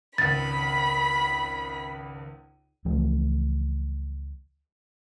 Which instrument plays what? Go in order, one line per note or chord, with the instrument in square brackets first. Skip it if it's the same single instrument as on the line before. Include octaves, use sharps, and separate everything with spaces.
[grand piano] G#1 C#2 [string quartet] B5 [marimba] A6
[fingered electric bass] C#2 E3 F3 A3